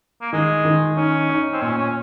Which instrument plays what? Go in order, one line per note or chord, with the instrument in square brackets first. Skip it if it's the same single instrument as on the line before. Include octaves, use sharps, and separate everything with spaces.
[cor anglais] A#3
[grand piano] D#3 [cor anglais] G#3
[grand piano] D#3
[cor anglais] C#4 [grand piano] D#4
[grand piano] D#4
[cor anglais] C4
[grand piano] A#2 [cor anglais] C#4
[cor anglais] C#4